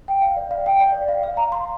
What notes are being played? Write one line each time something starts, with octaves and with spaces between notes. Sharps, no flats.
G5
F5
D5
F5
G5
D5
D5
F5
F5
A#5
C6